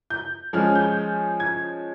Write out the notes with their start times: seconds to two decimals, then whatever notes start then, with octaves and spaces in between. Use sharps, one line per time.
0.10 G6
0.53 F3 G#3 C#4 F6
0.75 G6
1.40 G#6